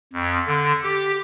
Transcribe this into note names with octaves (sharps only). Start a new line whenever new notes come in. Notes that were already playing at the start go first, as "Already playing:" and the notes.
F2
D3
G4